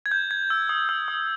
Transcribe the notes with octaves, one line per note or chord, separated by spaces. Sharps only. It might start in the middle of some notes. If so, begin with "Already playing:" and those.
G#6
G6
G#6
E6
D#6
E6
D#6